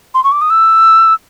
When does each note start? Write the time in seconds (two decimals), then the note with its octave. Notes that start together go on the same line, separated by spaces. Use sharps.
0.14 C6
0.24 C#6
0.32 D6
0.41 D#6
0.50 E6